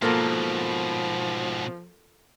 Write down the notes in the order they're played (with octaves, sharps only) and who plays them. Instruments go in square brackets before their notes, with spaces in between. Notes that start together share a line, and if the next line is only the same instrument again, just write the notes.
[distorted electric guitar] G#2 B2 [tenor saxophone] F3 [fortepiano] A#3 [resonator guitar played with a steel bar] F4 A4 A#4